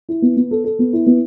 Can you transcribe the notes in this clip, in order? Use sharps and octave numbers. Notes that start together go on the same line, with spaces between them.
E4
B3
B3
A4
A4
B3
E4
B3